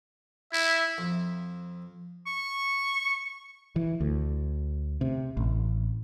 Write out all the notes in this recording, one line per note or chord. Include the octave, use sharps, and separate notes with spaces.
E4 E5
F2
C#6
E3
D2
C3
A1